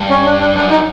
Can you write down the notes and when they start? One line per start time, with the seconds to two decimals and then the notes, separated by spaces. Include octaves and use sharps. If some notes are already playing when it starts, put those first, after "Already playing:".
Already playing: G2
0.10 C#4
0.26 D4
0.40 D4
0.55 F#2 D4
0.70 D#4